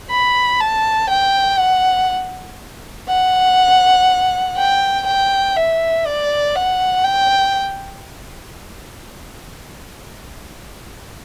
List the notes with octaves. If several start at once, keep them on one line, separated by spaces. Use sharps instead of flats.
B5
A5
G5
F#5
F#5
G5
G5
E5
D5
F#5
G5